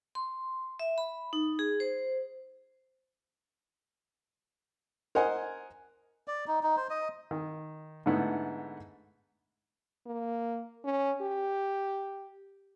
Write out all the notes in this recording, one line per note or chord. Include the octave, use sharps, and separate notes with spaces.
C6
E5
B5
D#4
G#4
C5
A#4 C5 D#5 F#5 G#5
D5
D#4
D#4
C5
D#5
D#3
G#2 D3 A3 B3 D#4 E4
A#3
C#4
G4